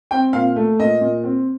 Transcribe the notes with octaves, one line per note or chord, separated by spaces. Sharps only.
C4 G5
A#2 F5
A3
A#2 D#5
A#2
C4